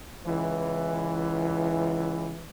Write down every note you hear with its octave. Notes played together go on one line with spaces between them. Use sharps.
C#2 E3